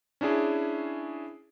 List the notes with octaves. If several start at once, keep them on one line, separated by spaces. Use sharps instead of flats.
C#4 D4 E4 G#4